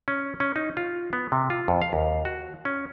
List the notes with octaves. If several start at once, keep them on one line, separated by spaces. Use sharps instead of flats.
C#4
C#4
D#4
F4
B3
C3
F4
F2
F5
D#2
F#4
C#4